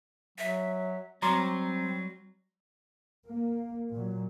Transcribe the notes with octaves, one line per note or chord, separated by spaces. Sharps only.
F#3 E5
F#3 G3 C4 A#5 C6 D6
A#3
A#2 F#3